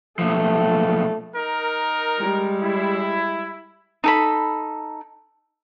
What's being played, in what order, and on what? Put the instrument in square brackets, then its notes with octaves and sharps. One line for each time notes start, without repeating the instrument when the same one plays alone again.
[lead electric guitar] B1 F3 [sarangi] A3
[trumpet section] D#4 A#4
[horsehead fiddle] G3 G#3
[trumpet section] E4
[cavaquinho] D#4 A4 B5